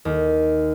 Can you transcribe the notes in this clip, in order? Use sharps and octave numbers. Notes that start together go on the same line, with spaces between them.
D#2